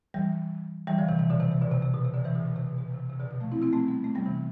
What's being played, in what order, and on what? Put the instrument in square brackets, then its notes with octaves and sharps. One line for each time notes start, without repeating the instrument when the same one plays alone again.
[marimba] E3 G3
E3 G3
D3 F3
C3 E3
C3 E3
B2 D3
C3 E3
C3
B2 D3
C3
C3
B2
C3
B2 D3
C3 E3
B2 D3
B2
C3
B2
B2
C3
C3
B2 D3
B2
F3 A3
C4 E4
C4 E4
A3 C4
G3 B3
A3 C4
G3 B3
C3 E3